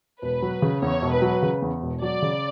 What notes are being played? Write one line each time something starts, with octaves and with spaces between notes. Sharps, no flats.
E1 B4
F#3
C#3
E2 C#5
E1
B4
F#3
C#3
E2
E1
F#3 D5
C#3